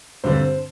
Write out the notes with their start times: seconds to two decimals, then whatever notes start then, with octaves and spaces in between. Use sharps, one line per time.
0.24 G2 D3 G3 C4 C5